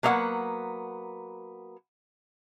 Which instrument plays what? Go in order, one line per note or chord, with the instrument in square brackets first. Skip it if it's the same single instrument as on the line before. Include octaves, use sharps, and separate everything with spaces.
[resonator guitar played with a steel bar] F#3 A#3 B3 D#5 F#5